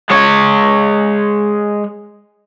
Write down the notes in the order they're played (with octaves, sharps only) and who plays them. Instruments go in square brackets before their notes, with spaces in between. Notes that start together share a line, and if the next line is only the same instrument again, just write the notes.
[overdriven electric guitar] G#3 C#5